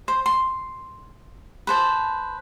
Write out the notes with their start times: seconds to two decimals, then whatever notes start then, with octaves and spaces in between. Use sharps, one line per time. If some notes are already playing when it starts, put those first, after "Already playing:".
0.08 C5
0.26 C6
1.67 B4 C5 A5